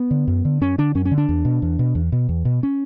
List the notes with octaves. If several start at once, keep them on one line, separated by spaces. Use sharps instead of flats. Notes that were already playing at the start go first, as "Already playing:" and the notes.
Already playing: B3
D3
F#2
D3
F#2 C#4
D3 D4
F#2 C#4
C#4
D3
D4
E2
B2
E2
B2
E2
B2
E2
B2
C#4